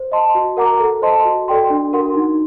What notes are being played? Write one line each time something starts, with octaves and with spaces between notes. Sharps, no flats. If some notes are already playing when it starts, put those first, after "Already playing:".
Already playing: C5
D#5 A5 C6
F#4
A#4 F#5 A#5 D6
A4
C5 D#5 A5 C6
F#4
A4 D5 G5 C6
D4
F#4 A#4 F#5 C6
D#4